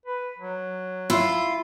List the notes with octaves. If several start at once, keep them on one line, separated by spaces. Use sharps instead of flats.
B4
F#3
E4 F4